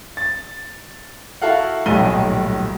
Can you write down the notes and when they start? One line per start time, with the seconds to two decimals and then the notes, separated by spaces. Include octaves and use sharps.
0.17 A6
1.42 E4 F#4 A4 F5 F#5
1.86 D#1 B1 A2 G#5 D#7 G7